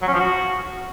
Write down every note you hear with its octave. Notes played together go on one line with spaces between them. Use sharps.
F#3
C#4
F3
F#4